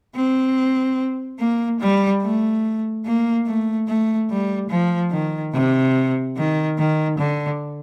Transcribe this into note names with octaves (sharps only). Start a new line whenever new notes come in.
C4
A#3
G3
A3
A#3
A3
A3
G3
F3
D#3
C3
D#3
D#3
D3